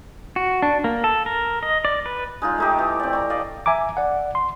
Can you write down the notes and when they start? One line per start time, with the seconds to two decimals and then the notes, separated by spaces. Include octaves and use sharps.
0.36 F#4
0.62 D4
0.84 A#3
1.04 A4
1.26 A#4
1.63 D#5
1.85 D5
2.06 B4
2.42 G#3 D#4 F4
2.58 A3 D#4 G4
2.78 E3
3.00 C4 D5
3.13 A#5 C#6
3.30 D5 D#5 F5
3.66 E5 G#5 A#5 D6
3.97 D5 F#5
4.35 C6